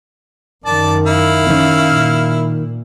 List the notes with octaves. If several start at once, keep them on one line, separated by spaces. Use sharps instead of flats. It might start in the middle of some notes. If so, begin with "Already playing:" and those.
F#2 D#3 D5 A5
E4 F5
D#3 C#4
A#2